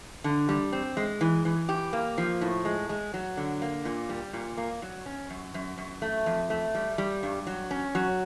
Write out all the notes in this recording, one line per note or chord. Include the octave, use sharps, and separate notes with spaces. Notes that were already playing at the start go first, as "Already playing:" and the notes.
D3
G3
C4
G#3
E3
E3
G4
A#3
F3
A2
G#3
G#3
F#3
D3
A#3
A#2
G3
A#2
A#3
F#3
C#4
F#2
F#2
F#2
A3
F2
A3
G3
G3
G2
F#3
C#4
F#3